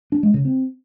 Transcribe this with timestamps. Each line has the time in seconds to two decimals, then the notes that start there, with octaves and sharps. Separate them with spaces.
0.12 D4
0.23 G#3
0.34 C#3
0.45 C4